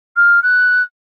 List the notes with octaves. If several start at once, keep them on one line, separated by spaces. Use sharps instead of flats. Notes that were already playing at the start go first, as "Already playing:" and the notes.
F6
F#6